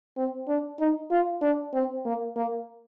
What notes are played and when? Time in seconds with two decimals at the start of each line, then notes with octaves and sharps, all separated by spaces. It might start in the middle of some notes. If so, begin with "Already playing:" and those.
0.17 C4
0.48 D4
0.80 D#4
1.11 F4
1.42 D4
1.74 C4
2.05 A#3
2.36 A#3